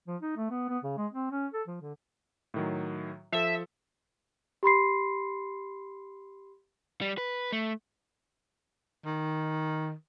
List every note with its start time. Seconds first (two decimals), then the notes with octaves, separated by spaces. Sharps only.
0.08 F3
0.21 D#4
0.37 A3
0.51 B3
0.69 B3
0.84 C#3
0.97 G#3
1.12 C4
1.31 C#4
1.53 A4
1.67 F3
1.81 D3
2.54 A2 D#3 F#3
3.32 F3 A4 E5
4.63 G4 B5 C6 C7
7.01 G3
7.18 B4
7.52 A3
9.05 D#3